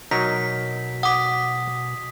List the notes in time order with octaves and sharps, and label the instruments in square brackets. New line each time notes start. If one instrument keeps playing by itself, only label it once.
[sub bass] B2 [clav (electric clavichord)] F#3 D#4 A#4 [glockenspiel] B6
[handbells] F#5 D6 [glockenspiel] D#6 B6